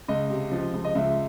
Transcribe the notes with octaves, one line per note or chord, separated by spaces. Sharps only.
C#2 D#5
C3
F3
C#2
D#5
C#2 E5